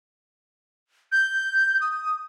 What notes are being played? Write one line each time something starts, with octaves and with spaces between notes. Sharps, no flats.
G6
D#6